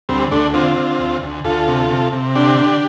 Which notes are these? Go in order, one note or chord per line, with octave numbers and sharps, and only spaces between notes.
D2 G3 C4
D2 A3 D4
D3 C4 F4
D3
D2
D2
D2 F4 A4
C3
C3
C3
D3 D4 G4
D3